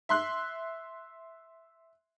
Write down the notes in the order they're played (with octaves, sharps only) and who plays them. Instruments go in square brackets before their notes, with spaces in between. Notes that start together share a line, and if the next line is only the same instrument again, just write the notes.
[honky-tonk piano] E5 C6 F#6